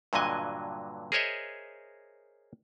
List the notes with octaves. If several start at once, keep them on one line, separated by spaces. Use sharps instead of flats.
G2 A#2 D3 F#3 D#5 G#5
G#4 A#4 C5 C#5 D#5 E5